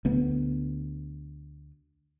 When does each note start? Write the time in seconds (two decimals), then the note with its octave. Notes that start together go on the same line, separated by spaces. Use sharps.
0.05 D2 B3